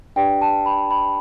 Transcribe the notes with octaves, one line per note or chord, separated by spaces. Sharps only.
D4 G4 B4 D5 G5
A5
B5
B5